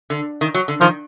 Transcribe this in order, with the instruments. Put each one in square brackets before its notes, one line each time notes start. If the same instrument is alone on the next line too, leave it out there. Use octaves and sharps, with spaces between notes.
[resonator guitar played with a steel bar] D3
D#3
F#3
D3
[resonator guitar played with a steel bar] D#3 [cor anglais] F3